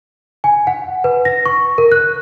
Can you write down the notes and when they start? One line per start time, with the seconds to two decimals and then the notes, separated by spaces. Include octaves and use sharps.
0.44 G#5
0.67 F#5
1.04 B4
1.25 A#6
1.46 C#6
1.78 A#4
1.92 F#6